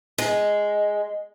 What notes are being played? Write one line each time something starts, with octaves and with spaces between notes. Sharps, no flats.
G#3